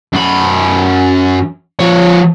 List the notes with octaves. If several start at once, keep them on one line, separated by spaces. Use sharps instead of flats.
F#2 B5
F3 C#5